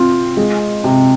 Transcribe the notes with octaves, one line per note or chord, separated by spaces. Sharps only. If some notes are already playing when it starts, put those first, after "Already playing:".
Already playing: C4 F4
G#3
C3